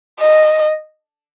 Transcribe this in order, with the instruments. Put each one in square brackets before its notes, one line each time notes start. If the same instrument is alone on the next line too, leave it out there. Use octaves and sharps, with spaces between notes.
[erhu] D#5